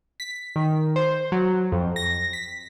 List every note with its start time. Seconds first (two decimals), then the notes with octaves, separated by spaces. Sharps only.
0.20 B6
0.56 D#3
0.96 C5
1.32 F#3
1.72 F2
1.96 A#6
2.33 B6